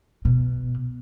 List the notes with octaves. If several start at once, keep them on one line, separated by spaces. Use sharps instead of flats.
B2